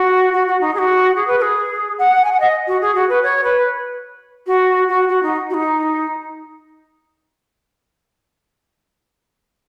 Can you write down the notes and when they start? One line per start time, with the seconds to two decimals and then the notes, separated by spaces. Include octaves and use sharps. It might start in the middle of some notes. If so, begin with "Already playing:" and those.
Already playing: F#4
0.33 F#4
0.47 F#4
0.60 D#4
0.74 G#4
0.78 F#4
1.15 G#4
1.27 B4
1.38 B4
1.41 G#4
1.98 F#5
2.24 G#5
2.32 F#5
2.40 D#5
2.67 F#4
2.81 G#4
2.94 F#4
3.09 B4
3.22 C#5
3.43 B4
4.46 F#4
4.88 F#4
5.08 F#4
5.22 D#4
5.49 F#4
5.53 D#4